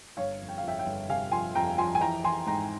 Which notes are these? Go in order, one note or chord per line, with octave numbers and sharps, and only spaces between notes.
G1 C#5 F5
F2
G5
F2 F5
E5 G5
E5 G5
G1
C3 F5 G#5
F3 G#5 C6
F2 G5 A#5
F3 G#5 C6
G#5
E3 G5 A#5
E3 G#5 C6
G#2 G5 A#5